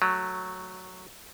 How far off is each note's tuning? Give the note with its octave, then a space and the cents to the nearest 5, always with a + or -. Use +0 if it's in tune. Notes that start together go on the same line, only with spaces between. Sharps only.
F#3 +0 A3 +0